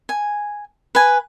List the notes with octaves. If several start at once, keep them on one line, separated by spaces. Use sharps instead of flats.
G#5
B4 G#5